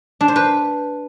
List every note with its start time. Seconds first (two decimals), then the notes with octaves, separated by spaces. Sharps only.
0.21 D4
0.28 C5
0.36 B4